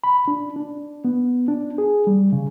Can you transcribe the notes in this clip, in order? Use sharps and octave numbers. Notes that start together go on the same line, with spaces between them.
B5
D4
D4
B3
D4
G#4
G3
C#3